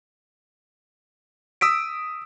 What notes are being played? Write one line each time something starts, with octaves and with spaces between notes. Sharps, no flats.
D#6 E6 B6 D7